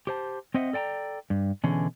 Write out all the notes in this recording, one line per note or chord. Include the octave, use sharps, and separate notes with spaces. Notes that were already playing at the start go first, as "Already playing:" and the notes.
G4 C5 A5
C4 C5 D#5 E5 F#5
A4 D5 G5 A5 A#5
G2
B2 D3 E3 C#4 G#4